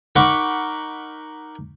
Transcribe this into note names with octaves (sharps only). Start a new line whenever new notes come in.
D#4 A#4 F#5 B5 C#6 D6